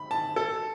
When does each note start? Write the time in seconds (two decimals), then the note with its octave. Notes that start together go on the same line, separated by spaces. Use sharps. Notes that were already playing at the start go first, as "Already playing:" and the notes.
Already playing: B5
0.11 A5
0.36 A4